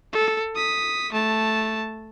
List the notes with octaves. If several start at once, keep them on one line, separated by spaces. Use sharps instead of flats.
A4
D#6 B6
A3 A5